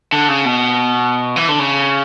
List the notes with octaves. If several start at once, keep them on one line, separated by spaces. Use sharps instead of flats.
D3
C#3
B2
E3
D3
C#3